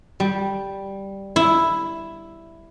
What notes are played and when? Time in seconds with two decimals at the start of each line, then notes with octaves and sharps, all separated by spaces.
0.20 G3
1.36 E4